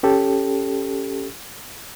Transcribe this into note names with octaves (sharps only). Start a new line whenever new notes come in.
C#4 G4 A4